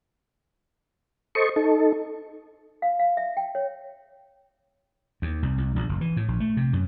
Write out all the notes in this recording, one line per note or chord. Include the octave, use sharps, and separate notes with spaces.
A4 C5 D#5 C#6
D#4 A4
F5
F5
E5
G5
C#5
D#2
C2
C2
A#1
F#1
E3
A2
A#1
A3
C3
F#2